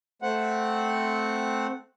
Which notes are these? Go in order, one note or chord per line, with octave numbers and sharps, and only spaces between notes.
A3 C4 F#5